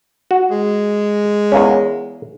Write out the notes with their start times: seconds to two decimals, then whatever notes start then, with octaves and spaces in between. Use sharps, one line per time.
0.31 F#4
0.51 G#3
1.52 E2 A#3 C#4